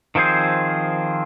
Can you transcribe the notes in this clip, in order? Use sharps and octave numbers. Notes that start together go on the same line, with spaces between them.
D#3 F3 C4 G#4 C5